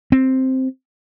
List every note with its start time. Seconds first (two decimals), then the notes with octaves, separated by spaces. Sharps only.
0.12 C4